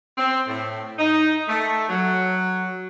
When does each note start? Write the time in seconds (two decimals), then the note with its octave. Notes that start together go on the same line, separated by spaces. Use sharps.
0.18 C4
0.48 A2
0.98 D#4
1.48 A3
1.89 F#3